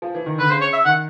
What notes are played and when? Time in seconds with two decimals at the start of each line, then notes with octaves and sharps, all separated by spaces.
0.02 F3
0.14 E3
0.26 D#3
0.38 D3 B4
0.50 C#3 C5
0.61 C#5
0.73 E5
0.85 D#3 F#5